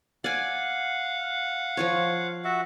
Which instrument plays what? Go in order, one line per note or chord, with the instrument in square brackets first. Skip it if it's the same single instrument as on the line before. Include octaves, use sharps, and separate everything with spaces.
[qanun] D5 G#5 [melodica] F5 F#5
[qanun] F3 F4 C#5
[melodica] F#4 E5 F#5